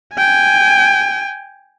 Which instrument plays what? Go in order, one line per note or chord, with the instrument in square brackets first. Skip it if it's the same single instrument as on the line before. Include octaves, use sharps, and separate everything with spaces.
[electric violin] G5 G#5